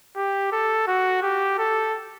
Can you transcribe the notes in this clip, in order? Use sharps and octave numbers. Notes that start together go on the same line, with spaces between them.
G4
A4
F#4
G4
A4